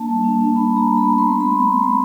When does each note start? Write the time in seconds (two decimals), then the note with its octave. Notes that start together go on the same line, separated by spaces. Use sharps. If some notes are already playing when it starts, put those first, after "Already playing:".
Already playing: A#3 D4 A5
0.09 G3
0.24 D4
0.40 D4
0.55 D4 B5
0.72 B3 A#5
0.87 G3
0.97 B5
1.03 B3
1.18 A3 C6
1.35 A3
1.40 B5
1.50 C4
1.60 A#5
1.66 A3
1.82 A3